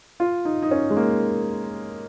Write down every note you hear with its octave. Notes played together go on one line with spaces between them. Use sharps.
F4
D#4
D#4
C#4
G#3
A#3